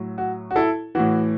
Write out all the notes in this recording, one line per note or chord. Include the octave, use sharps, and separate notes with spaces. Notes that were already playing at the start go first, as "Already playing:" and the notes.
Already playing: A2 F#3
F#4
F#4
E4 A4
A2 E3 F#4